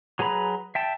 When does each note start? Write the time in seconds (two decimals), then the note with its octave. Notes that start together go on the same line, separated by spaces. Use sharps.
0.19 F#3 G#4 B4 A#5 B5
0.75 E5 G5 A5